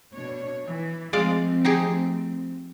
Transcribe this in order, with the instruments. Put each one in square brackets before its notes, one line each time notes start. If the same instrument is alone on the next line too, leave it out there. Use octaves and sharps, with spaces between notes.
[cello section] B2 D4 C#5
E3
[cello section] F3 A3 C4 [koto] G#3 D5 F5
[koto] D#4 G4 G#4